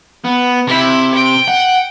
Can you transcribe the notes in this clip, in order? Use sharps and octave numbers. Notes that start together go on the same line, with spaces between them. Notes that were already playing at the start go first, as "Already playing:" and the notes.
B3
C3 E4
G5
F#5